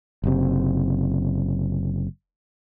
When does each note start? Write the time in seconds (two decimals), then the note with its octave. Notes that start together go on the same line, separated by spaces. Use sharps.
0.24 F#1 C3